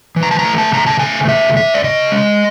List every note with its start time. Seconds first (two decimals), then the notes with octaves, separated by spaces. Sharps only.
0.16 E3
0.23 A#5
0.31 A5
0.39 A#5
0.44 A3
0.58 A5
0.72 C#3 A#5
0.86 A5
0.99 A3 G#5
1.27 C#3 E5
1.56 C#3 E5
1.74 D5
1.84 C#3 D#5
2.12 G#3